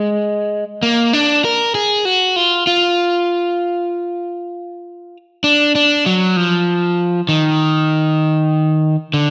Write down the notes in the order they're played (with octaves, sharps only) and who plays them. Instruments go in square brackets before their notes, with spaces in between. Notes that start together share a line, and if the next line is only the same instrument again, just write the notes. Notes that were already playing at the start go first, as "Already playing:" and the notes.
Already playing: [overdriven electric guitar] G#3
A#3
D4
A#4
G#4
F#4
F4
F4
D4
D4
F#3
F3
D#3
D3